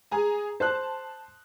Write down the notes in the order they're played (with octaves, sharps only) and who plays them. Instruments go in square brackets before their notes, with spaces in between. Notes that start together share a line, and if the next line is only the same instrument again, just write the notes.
[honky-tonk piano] G#4 G#5 A#5
[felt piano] C5 F#6 [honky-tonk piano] A5